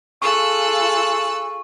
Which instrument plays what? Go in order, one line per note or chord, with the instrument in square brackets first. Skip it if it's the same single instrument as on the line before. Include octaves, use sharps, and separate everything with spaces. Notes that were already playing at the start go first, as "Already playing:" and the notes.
[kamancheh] F4 G#4 [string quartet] A4 E6 F#6 [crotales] C#6